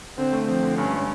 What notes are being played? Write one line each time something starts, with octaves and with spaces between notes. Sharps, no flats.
D3 C4
A3
F3 C4
D3
G2 C#4
G#3